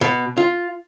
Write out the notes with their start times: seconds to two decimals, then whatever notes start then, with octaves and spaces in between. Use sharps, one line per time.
0.01 B2
0.38 F4